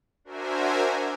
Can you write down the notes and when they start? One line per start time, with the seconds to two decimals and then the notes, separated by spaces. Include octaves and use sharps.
0.24 D4 F#4 A#4 C5 E5 G#5